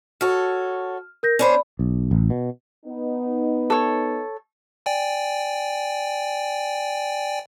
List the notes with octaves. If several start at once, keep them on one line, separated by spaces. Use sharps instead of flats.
F#4 A4 C#5 F6
A#4 G6 A#6
C#4 D4 C5 D5 B5
B1
A1
B2
B3 D#4
A4 C#5
D5 G5 G#5